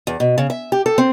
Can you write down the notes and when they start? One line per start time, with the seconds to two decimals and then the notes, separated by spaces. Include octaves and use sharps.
0.07 E2
0.20 B2
0.38 C#3
0.50 E5
0.72 G4
0.86 A4
0.98 C4